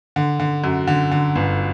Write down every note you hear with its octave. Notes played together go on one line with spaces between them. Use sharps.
D3
D3
F#2
D3
D3
G1